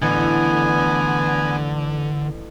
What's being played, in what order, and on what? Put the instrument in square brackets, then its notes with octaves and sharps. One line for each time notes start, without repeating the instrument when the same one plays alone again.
[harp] A1 [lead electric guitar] D3 [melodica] B3 G#5